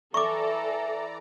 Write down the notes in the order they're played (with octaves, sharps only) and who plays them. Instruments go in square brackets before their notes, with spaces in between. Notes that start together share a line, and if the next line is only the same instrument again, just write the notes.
[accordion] E3 D5 A#5 [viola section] A4 [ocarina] E5 [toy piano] C#6 D6